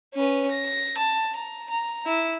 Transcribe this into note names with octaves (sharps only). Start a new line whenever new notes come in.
C#4 B4
A#6
A5
A#5
A#5
E4